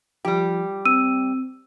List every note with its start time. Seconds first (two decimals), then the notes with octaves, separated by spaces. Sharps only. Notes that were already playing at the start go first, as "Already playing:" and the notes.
0.25 F3 G3 G4
0.85 C4 E6 D#7